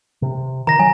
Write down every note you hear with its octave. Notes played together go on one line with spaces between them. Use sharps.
C3
D#3 A#5 A#6
F#3 G#5